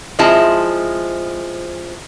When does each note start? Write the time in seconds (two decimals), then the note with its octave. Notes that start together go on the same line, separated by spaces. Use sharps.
0.19 F3 G#3 C4 E4 D#5 A5